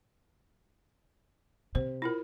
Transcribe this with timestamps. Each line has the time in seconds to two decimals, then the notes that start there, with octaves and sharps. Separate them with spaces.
1.75 C3 C5
2.02 E4 F4 A#4